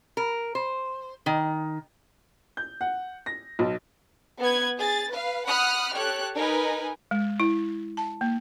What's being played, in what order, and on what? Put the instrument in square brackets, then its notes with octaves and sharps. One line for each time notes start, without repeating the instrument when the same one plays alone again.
[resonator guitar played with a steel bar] A#4
C5
D#3
[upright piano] G6
F#5
A#6
B1
[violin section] B3 B4 G#6
G#4 A6
B4 F5
F#5 B5 D#6 F6 F#6
G4 A4 C#5 F#6
D#4 A#4 B4 G#5
[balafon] G#3
E4
A5
A#3